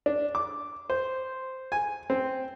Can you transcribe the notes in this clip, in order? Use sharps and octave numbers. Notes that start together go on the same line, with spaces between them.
D4
D6
C5
G#5
C4